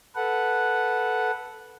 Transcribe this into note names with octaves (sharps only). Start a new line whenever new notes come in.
A4 B4 F#5